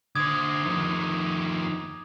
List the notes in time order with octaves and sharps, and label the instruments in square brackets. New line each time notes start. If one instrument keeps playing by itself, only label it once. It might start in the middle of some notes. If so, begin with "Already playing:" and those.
[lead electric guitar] D3 C5 [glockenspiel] D6 D#6 G#6
[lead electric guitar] F2 D#3